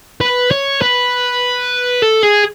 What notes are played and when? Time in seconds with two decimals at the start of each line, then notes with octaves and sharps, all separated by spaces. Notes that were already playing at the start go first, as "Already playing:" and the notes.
0.21 B4
0.51 C#5
0.82 B4
2.02 A4
2.23 G#4